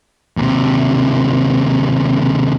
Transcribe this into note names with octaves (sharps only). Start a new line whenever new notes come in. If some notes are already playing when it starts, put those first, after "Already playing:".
D#2 C3